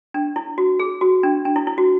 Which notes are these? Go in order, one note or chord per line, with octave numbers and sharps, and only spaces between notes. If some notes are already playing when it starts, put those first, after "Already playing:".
D4
E4
F#4
G#4
F#4
D4
D4
E4
E4
F#4